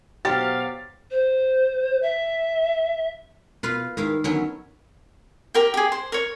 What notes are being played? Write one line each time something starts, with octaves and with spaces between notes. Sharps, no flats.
B2 F#3 G4 C5 F5 A6
C5
E5
B2 F4 B4 F5
G#2 D#3 E4 F5
D3 D#3 F#3 B3 C#4 E4
G4 A#4 G5
G4 G#4
C5
A#4 C#5